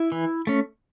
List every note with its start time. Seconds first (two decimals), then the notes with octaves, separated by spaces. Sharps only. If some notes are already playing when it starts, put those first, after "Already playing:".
Already playing: E4
0.12 E3
0.47 A3 C#4